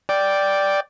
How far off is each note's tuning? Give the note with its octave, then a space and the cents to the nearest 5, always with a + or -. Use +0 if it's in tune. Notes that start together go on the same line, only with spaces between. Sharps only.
D5 +0 G5 +0